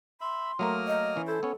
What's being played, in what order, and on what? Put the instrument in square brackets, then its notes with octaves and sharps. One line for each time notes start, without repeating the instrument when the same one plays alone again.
[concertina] E5 B5 [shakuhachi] C6
[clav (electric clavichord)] F#3 A3 A#4 [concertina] A#3 D#6 F6
[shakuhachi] D#5
[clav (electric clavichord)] E3 C#4
[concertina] E4 C5 [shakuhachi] A4
[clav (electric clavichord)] B3 C#4 [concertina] C#5